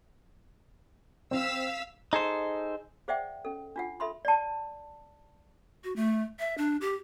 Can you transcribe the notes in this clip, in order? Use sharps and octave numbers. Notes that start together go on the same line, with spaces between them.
C4 F5 E6 B6
D#4 G#4 A4 C5
G#4 C5 D5 E5 F#5 G5
C#4 A4
D4 F4 F#5
A4 E5 B5 C6
D5 A5
F#4
A3
E5
D4
G4